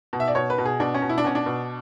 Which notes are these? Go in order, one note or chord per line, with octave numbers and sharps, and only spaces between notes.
B2
E5
D5
B2 C#5
B4
B2
G#4
B2 D4
C#4
B2
E4
D4
B2 C#4
D4
B2